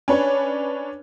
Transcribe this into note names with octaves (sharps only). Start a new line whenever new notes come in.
C#4 D4 B4 C#5